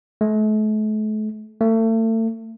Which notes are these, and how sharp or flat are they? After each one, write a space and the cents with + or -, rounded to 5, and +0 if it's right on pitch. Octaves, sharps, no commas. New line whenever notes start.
A3 -40
A3 +35